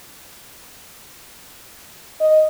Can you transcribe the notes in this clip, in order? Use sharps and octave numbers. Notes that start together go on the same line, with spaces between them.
D#5